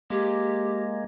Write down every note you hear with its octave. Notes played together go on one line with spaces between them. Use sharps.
G#3 A#3 G4